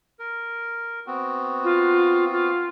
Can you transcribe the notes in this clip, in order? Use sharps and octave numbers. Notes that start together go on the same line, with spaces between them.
A#4
B3 C4 F#4
F4
F4